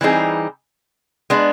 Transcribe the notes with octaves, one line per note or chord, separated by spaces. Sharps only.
E3 G3 C4 D#4 G#4
G#3 B3 D4